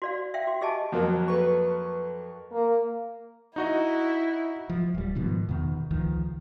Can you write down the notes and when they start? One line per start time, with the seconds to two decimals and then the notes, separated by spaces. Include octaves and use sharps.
0.02 F#4 D5 F5
0.34 E5 F5 G5
0.47 F#4
0.61 G4 G#4 D#5 G#5 A5
0.92 F2 F#3 A#3
1.28 A4 B4 C#6
2.52 A#3
3.56 D#4 E4 F#4 D#5
4.70 F3
4.94 D1 G3
5.15 G#2 B2 D#3 F3
5.49 E2 B2 D#3
5.91 C#2 D#3 F3